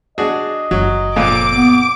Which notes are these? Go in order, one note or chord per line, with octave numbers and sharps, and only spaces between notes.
D4 F#4 G#4 D#5
F#1 F#3
F2 A#2 D6 D7
B3